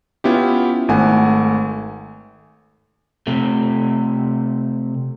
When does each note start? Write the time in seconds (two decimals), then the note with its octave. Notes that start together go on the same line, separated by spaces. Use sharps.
0.24 B3 C#4 E4 F4 G4
0.88 G#1 A3 F#5 G#5
3.27 C3 A3